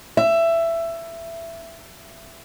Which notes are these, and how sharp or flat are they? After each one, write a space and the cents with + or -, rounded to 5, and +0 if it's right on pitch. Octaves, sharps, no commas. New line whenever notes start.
E5 +15